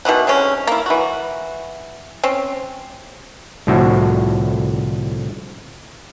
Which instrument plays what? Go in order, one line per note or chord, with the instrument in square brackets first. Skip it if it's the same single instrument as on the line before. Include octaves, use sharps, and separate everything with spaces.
[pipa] B2 D#3 E3 F#5
D3 G#3 C4 C#4
A#3 E4
E3 F#4
C4 C#4
[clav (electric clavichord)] C2 A2 D3 F3 F#4 E5